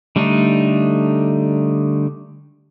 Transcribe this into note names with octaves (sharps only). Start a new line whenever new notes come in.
D3 G3 A3 D4 D#4